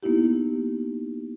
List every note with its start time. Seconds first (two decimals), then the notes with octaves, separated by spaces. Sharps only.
0.03 A#3 B3 D#4 E4 G4